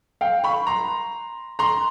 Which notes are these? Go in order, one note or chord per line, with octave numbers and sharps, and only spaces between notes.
F5 G5
B5 C#6
A#5 C6
A#5 C6